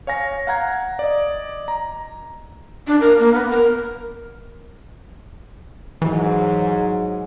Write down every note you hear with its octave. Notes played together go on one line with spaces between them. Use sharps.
C#5 F5 G#5 A#6
F5 F#5 A#5 G#6
D5 D#5
A#5
D4
A#4
A#3
B3
A#4
G#2 E3 F#3